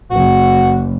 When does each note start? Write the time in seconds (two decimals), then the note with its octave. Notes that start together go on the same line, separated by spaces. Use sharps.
0.11 F#1 F#4